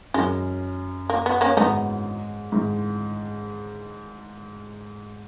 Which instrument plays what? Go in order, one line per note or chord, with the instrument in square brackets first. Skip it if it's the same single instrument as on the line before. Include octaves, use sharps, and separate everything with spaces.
[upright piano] F#2 [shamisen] G#3
[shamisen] A#3
B3
A#3 C#4
[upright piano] G#2 [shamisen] B3 D#4
[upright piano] G#2